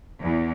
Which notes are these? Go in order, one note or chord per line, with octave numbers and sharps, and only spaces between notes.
E2